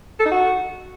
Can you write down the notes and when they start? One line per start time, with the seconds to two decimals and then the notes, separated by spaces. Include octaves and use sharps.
0.19 A4
0.25 D#4
0.31 F#4